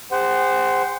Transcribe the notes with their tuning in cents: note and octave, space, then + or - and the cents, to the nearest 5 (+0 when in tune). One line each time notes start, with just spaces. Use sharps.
G#4 -45 C5 -10 F#5 +20